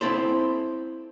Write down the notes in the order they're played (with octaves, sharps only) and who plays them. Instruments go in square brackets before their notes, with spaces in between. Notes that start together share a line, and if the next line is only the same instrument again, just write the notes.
[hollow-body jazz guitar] C4 E4 A4 C5